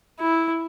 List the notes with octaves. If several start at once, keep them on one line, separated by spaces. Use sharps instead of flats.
E4